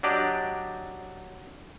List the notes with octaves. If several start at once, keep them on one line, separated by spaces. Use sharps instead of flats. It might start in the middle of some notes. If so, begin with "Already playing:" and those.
F#3 D4 G4 D5 D#5